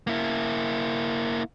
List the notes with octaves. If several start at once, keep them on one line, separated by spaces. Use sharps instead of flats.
A#3 E4